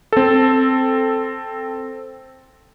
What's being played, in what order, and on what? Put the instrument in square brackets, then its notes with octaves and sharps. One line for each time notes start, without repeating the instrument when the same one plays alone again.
[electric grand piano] C4 A4